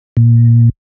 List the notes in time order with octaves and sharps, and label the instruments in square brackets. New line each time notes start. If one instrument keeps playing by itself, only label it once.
[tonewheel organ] A#2